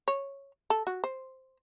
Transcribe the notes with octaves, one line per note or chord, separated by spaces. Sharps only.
C#5
A4
F#4
C5